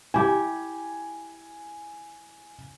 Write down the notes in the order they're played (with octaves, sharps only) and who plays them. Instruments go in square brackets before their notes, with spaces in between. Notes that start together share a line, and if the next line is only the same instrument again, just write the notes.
[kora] E4 G4 [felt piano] G#5